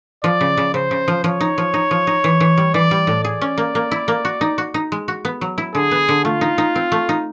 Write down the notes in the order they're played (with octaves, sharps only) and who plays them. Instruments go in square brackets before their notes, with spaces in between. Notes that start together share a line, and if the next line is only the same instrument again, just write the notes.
[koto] F3 [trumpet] D5
[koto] C#3
C#3
[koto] C#3 [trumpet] C5
[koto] C#3
F3
[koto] F3 [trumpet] C#5
[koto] D#4
F3
D#4
F3
D#4
E3
E3
G3
[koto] E3 [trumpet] D5
[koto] G3
A2
[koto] G#4 [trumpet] D5
[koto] C#4
A#3
A#3
E4
A#3
F#4
D#4
F#4
D#4
G#3
F#4
B3
F#3
E4
[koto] D3 [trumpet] G#4
[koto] B3
D3
[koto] A3 [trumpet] F4
[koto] D#4
D#4
C4
A3
D#4